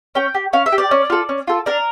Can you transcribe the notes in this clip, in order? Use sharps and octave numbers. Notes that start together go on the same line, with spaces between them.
C#4 G5
G4
C#4 F5
E5
G4
D5
C#4
F4 A4
C#4
F4 A4
D4 A#4